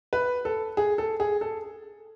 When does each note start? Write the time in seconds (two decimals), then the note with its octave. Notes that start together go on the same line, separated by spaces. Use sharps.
0.13 B4
0.45 A4
0.77 G#4
0.98 A4
1.20 G#4
1.41 A4